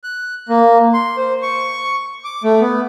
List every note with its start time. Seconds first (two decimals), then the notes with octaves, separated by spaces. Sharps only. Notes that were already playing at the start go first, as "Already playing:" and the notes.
0.03 F#6
0.49 A#3
0.94 C6
1.17 C5
1.42 C#6
2.24 D6
2.44 A3
2.60 B3